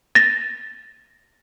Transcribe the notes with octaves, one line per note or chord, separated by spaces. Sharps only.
A6 A#6